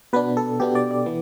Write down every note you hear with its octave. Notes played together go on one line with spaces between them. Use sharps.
B2 B3 D4 B4
A4
B2 B3 D4 G4
D5
D5
E3 B3